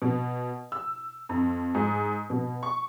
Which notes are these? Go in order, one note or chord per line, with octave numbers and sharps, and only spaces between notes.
B2
E6
F2
G#2
B2
C#6